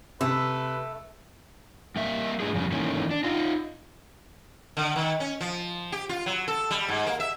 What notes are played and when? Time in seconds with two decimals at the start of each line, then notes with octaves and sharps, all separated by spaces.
0.21 C3 A3 B4
1.96 G3 A#3 E5
2.40 A#2 D#3 A3 D4 G#4
2.54 F2 C#3 G3
2.72 D#3 E3 A3 A#3 C#4
3.11 D4
3.24 D#4 F4
4.77 D3
4.96 D#3
5.20 C#4
5.41 F3
5.92 G4
6.09 F4
6.26 F#3
6.48 A4
6.71 G3
6.88 G#2
7.06 A#3
7.20 E5